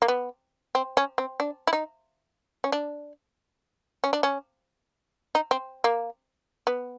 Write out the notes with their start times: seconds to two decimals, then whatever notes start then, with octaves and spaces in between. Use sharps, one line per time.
0.02 A#3
0.08 B3
0.75 C4
0.97 C#4
1.18 C4
1.40 D4
1.67 E4
1.73 D#4
2.64 C#4
2.72 D4
4.04 C#4
4.13 D4
4.23 C#4
5.35 D#4
5.51 C4
5.84 A#3
6.67 B3